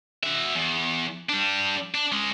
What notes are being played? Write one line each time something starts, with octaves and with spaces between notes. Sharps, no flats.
F#4 E5
E2
G3 D4
D4
G#3 C#4